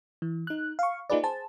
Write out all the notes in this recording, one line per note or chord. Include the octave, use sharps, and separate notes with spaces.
E3
D#4 F#6
F5 C#6
A#3 D#4 F4 G#4 B4 D5
G#4 C5 A5